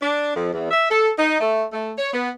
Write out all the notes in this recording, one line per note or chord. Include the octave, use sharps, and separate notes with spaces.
D4
F2
E2
E5
A4
D#4
A3
A3
C#5
B3